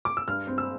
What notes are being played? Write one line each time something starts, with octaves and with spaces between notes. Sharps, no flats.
D6
E6
G2 F6
C4
E6